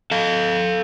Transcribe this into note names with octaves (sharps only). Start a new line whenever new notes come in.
A4 F5